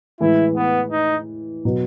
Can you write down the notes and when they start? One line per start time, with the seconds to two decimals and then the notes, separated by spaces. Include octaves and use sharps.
0.20 A2 E3 G#3 E4
0.56 B3
0.92 D#4
1.65 B2 F#3